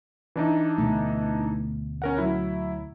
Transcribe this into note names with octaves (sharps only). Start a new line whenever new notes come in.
E3 D4 D#4
D2 B2 A3
C#4 A#4 F#5
F#3 E4